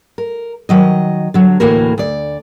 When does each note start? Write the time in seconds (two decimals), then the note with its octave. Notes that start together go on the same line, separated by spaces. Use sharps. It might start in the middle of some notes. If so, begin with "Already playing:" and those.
0.18 A#4
0.69 D#3 F#3 D#5
1.34 D3 F#3
1.60 D2 A2 E3 A#3 F#4 A#4
1.98 D2 D5